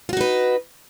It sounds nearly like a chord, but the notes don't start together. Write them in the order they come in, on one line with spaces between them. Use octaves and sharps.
F4 F#4 D#4 B4